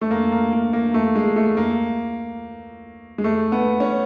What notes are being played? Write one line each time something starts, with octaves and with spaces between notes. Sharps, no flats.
A3
A#3
A#3
A#3
A#3
A3
G#3
A3
A#3
G#3
A3
B3
C#4